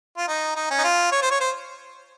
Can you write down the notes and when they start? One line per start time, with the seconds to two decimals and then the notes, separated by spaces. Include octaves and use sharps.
0.17 F4
0.28 D#4
0.56 D#4
0.70 C#4
0.78 D#4
0.84 F4
1.12 C#5
1.22 C5
1.31 C#5
1.40 C5